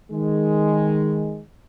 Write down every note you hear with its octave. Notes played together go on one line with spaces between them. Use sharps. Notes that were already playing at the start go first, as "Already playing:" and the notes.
D#3 G#3